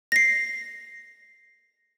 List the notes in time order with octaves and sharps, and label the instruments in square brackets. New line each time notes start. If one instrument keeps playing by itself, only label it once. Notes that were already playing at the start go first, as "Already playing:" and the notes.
[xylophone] A#6 C7